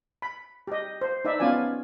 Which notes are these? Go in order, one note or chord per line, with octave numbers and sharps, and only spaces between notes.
B5
G4 D#5
C5
D#4 B4 D5 E5
B3 C#4 F4 D5 G#5